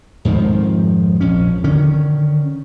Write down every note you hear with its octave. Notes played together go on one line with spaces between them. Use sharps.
F2 G#2 D#3 F3
A#1 F2 C#4
D3 D#3 C#4